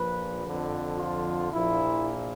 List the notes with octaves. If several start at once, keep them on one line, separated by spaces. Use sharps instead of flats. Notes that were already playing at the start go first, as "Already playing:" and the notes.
Already playing: A#1 A#2 F3 B4
F2 D3 F3
F4
A#1 A#2 F3 E4